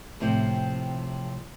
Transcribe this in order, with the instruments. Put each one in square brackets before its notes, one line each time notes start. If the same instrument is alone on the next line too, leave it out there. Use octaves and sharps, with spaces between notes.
[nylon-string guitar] A2 C3 F3 C4 G5